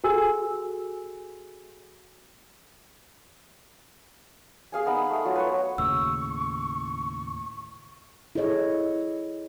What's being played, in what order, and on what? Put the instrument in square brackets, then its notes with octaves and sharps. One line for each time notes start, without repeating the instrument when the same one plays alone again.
[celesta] F#4 G#4 A4 G#5 E6
[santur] G#4 F5 G#5
B3 D#4 B5
A3
F#3 F4
B4 C#5
[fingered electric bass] D#2 A2 C#3 [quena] C#6 [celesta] E6
[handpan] E4 G#4 A4 C#5 D#5